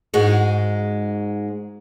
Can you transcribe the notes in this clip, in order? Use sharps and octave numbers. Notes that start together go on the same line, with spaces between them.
G#2 G#3 F#4